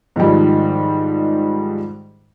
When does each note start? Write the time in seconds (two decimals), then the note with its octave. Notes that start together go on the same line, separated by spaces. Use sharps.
0.16 G#2 D#3 F3 G3